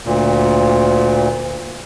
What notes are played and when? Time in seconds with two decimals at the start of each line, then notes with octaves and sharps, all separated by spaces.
0.05 D2 A#2